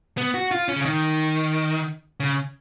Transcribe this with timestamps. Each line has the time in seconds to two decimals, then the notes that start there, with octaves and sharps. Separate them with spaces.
0.18 B3
0.34 F#4
0.51 F4
0.68 C#4
0.76 C#3
0.85 D#3
2.20 C#3